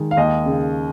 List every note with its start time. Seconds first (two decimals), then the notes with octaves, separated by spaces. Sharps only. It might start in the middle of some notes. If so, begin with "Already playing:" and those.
Already playing: D#3 G#3
0.11 F5
0.17 D#2 D#5
0.46 C#3